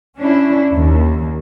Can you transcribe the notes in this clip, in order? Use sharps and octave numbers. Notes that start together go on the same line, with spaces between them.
C#4 D4 E4
D#2